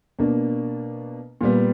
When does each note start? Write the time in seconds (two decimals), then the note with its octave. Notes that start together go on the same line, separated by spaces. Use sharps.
0.19 B2 A#3 D4
1.41 A#2 G3 B3